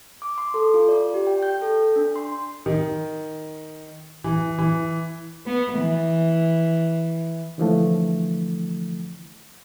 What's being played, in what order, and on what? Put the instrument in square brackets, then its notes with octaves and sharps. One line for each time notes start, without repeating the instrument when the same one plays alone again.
[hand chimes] D6
C6
A4
F4
D5
G4
G5
G6
A4
D4
C6
[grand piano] D#3
E3
E3
[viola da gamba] B3
E3
[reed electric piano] D3 E3 F3 A3